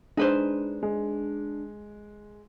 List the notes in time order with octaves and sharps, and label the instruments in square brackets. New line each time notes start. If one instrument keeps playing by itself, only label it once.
[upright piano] G#3 [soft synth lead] D4 [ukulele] D#4 B4 C5
[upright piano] G#3